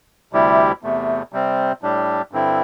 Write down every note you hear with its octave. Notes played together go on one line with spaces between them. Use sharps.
D2 C3 G3 E4 G4
E2 C3 A3
C3 G3 C4
A2 G3 D4 G4
G2 D3 C4 E4